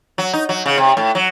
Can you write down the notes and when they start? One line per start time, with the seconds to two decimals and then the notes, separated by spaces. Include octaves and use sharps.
0.18 F#3
0.33 D#4
0.49 F#3
0.66 C#3
0.78 C3
0.97 A2
1.15 F#3